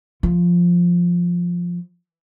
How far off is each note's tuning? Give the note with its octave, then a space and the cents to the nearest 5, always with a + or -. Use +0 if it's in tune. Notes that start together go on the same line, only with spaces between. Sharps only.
F3 +5